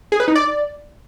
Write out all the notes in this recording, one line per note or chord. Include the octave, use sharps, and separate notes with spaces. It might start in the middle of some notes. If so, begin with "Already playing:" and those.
G#4
B4
D#4
D5